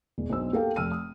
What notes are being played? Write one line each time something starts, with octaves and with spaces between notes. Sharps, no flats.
E1
B1 D4 C5 E6
A#3 G4 A4 F5 G5
F1 E6 F6 D#7
D#6